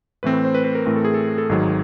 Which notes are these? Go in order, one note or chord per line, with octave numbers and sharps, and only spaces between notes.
A2 E3 A3 C4 B4
B4
C5
B4
B4
A#4
A2 E3 A3 C4 A#4
A4
G#4
A4
A4
G#1 G#2 D#3 F#3 G#4